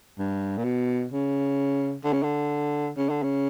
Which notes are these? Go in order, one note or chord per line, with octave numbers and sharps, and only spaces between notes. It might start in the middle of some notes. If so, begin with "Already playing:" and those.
G2
A#2
B2
C#3
D3
C#3
D3
C#3
D3
C#3